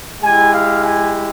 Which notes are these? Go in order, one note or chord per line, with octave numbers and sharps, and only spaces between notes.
G#3 E4 G4 G#5
F5
G#5